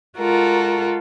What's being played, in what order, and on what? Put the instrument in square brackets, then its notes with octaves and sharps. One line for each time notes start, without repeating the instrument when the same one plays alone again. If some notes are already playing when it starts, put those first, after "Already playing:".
[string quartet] G#3 F4 F#4 A4 A#4